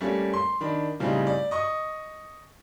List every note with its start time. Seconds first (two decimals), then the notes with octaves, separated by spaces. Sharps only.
0.01 G3 A3 A#3 C#4
0.33 C6
0.61 D#3 D4 B5
1.00 A2 C#3 G3 C4 D#4
1.27 D5
1.51 D#5 C#6 D#6